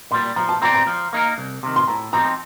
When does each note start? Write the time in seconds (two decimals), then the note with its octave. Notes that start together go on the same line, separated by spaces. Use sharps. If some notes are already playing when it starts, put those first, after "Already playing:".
0.11 A#2 G3 C6
0.36 F3 A#5
0.49 A5
0.62 C4 G4 D5 A#5
0.74 A#5
0.87 F3
1.13 A#3 D#4 A#4
1.38 C2
1.63 C3 D#3
1.76 C6
1.88 A2 A#5
2.13 F3 C4 D#4 G4 A#5